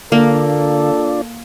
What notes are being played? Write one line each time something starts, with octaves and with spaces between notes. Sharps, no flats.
D3 A#3 D4 F4 A4 D5